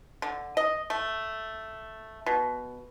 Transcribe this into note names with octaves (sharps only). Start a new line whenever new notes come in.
D3
D#5
A3
B2